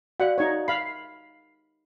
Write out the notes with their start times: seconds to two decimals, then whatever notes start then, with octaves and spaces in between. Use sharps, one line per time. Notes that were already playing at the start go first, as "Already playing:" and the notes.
0.20 F#4 D5 F5 F#5
0.38 D#4 C#5
0.68 F5 B5 C7